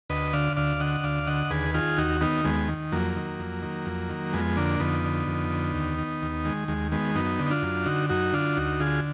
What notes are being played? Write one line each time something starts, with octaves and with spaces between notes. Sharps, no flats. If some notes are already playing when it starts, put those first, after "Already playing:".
D2 B4 D#5
D3 D5 F5
D2 D5 F5
D3 D#5 F#5
D2 D5 F5
D3 D#5 F#5
D#2 G#4 B4
D#3 F4 G#4
D#2 D#4 F#4
D#3 B3 D#4
D#2 G#3 B3
D#3
F2 F#3 A#3
D#3
F2
D#3
F2
D#3
F2 G#3 B3
D3 A#3 D4
F2 B3 D#4
D3
F2
D3
D#2
D#3
D#2
D#3 G#3
D#2 G#3
D#3 G#3 B3
F#2 B3 D#4
D3
D#4
D4 F4
F#2
D3 D#4 F#4
F#2 D#4 F#4
D3 D4 F4
D2 D#4 F#4
D3 F4 G#4